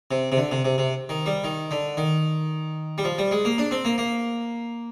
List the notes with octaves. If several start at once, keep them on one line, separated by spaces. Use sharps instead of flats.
C3
C3
D3
C3
C3
C3
D#3
G3
D#3
D3
D#3
G3
F3
G3
G#3
A#3
D4
C4
A#3
A#3